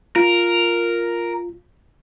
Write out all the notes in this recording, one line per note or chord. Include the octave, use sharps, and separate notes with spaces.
F4 A#4